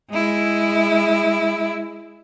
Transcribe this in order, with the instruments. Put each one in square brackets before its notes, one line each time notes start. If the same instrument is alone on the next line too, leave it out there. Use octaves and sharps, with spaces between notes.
[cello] G#3 E4